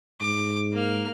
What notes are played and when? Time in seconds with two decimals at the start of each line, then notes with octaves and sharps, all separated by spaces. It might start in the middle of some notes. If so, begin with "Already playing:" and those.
0.21 G#2 D6
0.73 A#3 F6